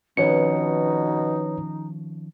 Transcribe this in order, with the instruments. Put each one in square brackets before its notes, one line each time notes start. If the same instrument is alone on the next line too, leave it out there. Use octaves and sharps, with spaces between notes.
[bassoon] B2 [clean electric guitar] D#3 F3 C#4 [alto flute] D#4 [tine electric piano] B4 C#5 C#7